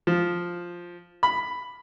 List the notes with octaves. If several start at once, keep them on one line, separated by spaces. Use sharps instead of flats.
F3
B5